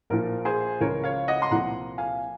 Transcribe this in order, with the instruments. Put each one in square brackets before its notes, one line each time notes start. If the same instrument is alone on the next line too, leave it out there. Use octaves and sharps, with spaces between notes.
[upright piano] A#1 A#2 F3 A#4
G#4 C5
C#2 C#3 F3 A#4 C#5
C#5 F5
D#5 F#5
C6
C2 A#2 F3 F#5 A#5
F5 G#5